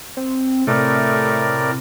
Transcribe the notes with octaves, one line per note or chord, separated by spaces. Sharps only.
C4
A2 C3 A3 A#4 D5